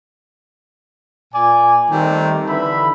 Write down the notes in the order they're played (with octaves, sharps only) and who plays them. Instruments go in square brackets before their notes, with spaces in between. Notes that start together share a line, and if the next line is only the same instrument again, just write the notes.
[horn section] A#2 D5 G#5
D#3 G3 A3 C4 D#4
D3 E3 E5 B5